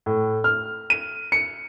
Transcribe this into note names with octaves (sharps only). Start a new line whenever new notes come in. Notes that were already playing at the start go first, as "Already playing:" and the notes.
A2
F6
D#7
C#7